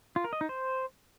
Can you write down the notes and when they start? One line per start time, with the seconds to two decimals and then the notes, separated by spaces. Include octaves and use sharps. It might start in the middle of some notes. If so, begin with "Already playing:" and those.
0.16 F4
0.24 A#4
0.33 D#5
0.41 D#4
0.49 C5